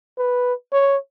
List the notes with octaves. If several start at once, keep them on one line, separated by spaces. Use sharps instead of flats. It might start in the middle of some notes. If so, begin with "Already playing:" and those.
B4
C#5